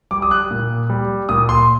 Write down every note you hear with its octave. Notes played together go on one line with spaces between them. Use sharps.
G3 D6
D#6
F#6
A#2
G3
A#2 D#6
C6